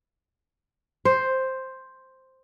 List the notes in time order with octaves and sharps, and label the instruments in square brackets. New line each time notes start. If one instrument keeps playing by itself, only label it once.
[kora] C5